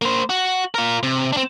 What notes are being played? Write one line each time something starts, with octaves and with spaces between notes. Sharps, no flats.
A#3 C5
F#4
F4 A#4
C3
C4 D4